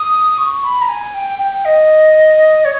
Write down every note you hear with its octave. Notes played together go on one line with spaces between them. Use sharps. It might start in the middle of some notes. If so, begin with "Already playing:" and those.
Already playing: D#6
C#6
B5
A#5
G#5
G5
G5
D#5
C#5